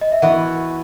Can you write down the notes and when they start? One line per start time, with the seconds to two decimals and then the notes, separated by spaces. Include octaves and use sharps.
0.01 D#5
0.12 E5
0.22 E3 B3 F#4 F#5